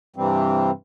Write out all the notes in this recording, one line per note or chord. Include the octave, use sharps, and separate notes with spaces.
G2 C3 E3 G3 C4